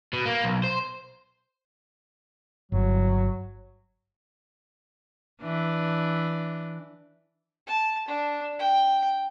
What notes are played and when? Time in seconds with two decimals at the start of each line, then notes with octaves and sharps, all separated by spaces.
0.13 B2
0.26 A#3
0.43 B1
0.63 C5
2.72 G1 F#3
5.41 E3 D4
7.67 A5
8.08 D4
8.59 G5